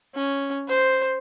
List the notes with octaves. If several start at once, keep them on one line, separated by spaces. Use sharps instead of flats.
C#4
C5